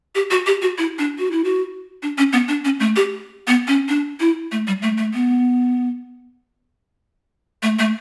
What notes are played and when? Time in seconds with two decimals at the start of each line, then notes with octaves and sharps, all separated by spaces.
0.15 G4
0.31 F#4
0.46 G4
0.62 F#4
0.78 E4
0.99 D4
1.18 F#4
1.32 E4
1.45 F#4
2.03 D4
2.18 C#4
2.33 B3
2.48 D4
2.65 C#4
2.80 A3
2.96 G4
3.47 B3
3.68 C#4
3.89 D4
4.20 E4
4.52 A3
4.67 G3
4.82 A3
4.98 A3
5.14 B3
7.63 A3
7.79 A3